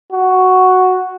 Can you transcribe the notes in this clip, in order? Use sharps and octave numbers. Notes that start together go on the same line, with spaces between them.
F#4